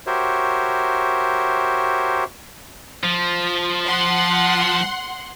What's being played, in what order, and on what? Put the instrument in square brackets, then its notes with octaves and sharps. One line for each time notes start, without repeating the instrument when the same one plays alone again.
[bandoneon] F#4 G4 A#4 C5 C#5 E5
[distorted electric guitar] F3
[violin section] F#5 C6